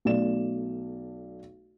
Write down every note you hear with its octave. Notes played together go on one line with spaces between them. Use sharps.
B1 A3 D5 E7